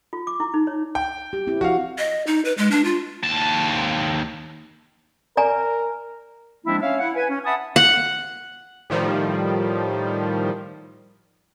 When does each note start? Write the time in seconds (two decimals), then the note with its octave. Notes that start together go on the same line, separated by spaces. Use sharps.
0.13 F4
0.27 D6
0.40 E4
0.54 D#4
0.67 C#5
0.95 G5
1.33 G4
1.47 C4 E4 G4
1.61 F3 F#4 F5
1.98 D#5
2.27 D#4
2.45 B4
2.58 G#3
2.71 D4
2.85 F4
3.23 D#2 A5
5.37 A#4 D5 G#5 A#5
6.65 F3 G#3 A#3 C4 D4 E4
6.81 C#4 C#5 E5 F5
6.99 E4 F#5
7.14 B4 G#5
7.28 C#4
7.44 E5 F#5 G#5 A5 B5 D#6
7.76 F#5
8.90 A2 D#3 F3 G3